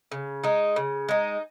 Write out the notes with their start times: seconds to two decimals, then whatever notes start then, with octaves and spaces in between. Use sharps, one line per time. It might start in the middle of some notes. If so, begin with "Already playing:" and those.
0.12 C#3
0.43 G#3 D#4
0.76 C#3
1.09 G#3 D#4